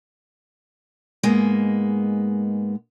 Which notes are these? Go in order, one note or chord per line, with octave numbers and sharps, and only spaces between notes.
G#2 G#3 A#3 B3